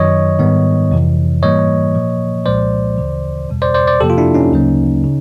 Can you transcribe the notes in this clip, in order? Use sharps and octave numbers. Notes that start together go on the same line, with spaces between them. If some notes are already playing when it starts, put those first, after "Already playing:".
Already playing: F#2 D#3 F#3 C#5 D#5
G#2 D#3 G3 B3
F2 C3 E3
G#2 E3 G3 A#3 C#5 D#5
A#2 F3 A#3
C2 A#2 F3 G#3 C5 D5
D2 C#3 E3
E2 B2 G3
C5 D5
C5 D5
C5 D5
F2 C3 F3 A#3 G4 A4
F4
D4 E4
C#4 D#4
D2 C#3 F#3 A#3
C#3